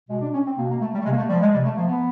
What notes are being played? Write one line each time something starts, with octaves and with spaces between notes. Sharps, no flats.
B2 G#3
D4
C#4
C4
B2 A#3
A#3
A3
G3
A3
C3 G#3
A#3
A3
F3 G3
G#3
C3 G3
A3
F3 A#3
B3